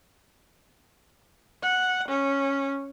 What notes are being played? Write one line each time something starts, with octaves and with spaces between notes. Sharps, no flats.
F#5
C#4